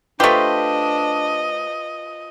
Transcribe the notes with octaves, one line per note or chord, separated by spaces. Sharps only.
A3 D4 F4 G4 B4 C5 D#5